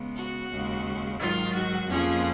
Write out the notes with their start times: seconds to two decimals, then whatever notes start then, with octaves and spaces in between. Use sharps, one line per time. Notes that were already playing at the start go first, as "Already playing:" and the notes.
Already playing: C#3 G#3 B3
0.15 F#4
0.50 D#2 C#3 G#3
1.19 G#2 D#3 F#3 F4
1.54 F#4
1.88 F2 F3 A#3 C#4 G#4